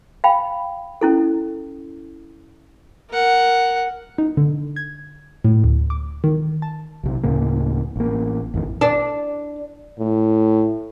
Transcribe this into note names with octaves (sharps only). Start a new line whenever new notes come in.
F5 G5 B5
C#4 E4 A4
A#4 F#5
D#4
D3
G#6
A2
D2
D6
D#3
A5
B1 C3
D2 A2 C#3 A#3
A1 A#3
A1 F2 A2 D#3
D4
A2